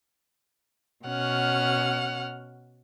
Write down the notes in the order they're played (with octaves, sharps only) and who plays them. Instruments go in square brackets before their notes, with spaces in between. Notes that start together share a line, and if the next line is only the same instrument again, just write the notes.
[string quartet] B2 C#4 F#5 F6